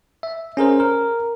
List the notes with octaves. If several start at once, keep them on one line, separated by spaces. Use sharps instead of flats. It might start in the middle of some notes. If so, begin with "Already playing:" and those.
E5
C#4 G#4 A#4 C5
A#4